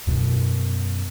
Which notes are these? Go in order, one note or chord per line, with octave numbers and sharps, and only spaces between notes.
F#2 B2